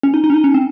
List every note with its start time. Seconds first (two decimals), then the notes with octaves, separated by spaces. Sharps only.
0.03 C#4
0.14 D#4
0.24 D#4
0.30 C#4
0.34 D#4
0.44 C#4
0.54 C4